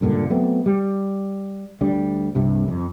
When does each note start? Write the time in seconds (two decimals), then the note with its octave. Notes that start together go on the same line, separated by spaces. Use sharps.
0.01 C#2 G2 A#2 D3
0.30 F#3 A3 B3 C4
0.66 G3
1.81 D2 G3 D4
2.35 C2 G2 C3
2.68 F2